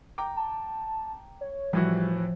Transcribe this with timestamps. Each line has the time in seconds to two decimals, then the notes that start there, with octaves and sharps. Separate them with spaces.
0.18 G5 A#5 D6
0.36 A5
1.41 C#5
1.73 A2 E3 F3 G3 F#4